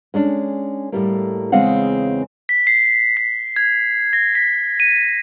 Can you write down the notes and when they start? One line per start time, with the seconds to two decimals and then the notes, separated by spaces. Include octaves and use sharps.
0.14 G#3 C#4 D4
0.92 A2 G3 A#3
1.52 E2 C#3 G#3 C4 F5 F#5
2.49 B6
2.67 C7
3.17 B6
3.56 G#6
4.13 A#6
4.35 B6
4.80 D#7